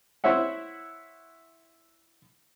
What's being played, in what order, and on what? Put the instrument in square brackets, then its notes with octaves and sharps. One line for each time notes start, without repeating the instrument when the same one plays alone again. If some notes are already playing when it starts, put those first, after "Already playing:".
[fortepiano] E4 C5 C#5 E5 F#5